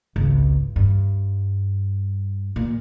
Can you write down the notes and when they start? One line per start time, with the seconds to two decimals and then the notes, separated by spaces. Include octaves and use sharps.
0.16 G#1 C#2
0.76 G2
2.56 A#2